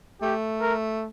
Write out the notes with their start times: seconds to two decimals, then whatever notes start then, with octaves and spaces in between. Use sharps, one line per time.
0.22 A3 G4
0.61 A#4